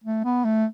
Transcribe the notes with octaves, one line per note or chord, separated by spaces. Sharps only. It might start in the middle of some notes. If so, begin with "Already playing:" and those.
A3
B3
A3